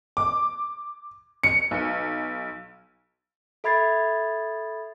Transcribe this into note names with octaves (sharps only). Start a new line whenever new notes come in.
D6
C#7
B1
A4 E5 B5 G#6 A6 C7